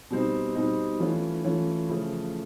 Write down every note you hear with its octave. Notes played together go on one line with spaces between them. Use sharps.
B2 G3 C4 D#4
B2 G3 C4 D#4
E3 A3 C#4 F4
E3 A3 C#4 F4
C#3 F3 A3